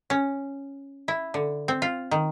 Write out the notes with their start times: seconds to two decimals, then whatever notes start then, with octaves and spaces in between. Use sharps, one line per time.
0.10 C#4
1.08 E4
1.34 D3
1.68 C4
1.82 F4
2.11 D#3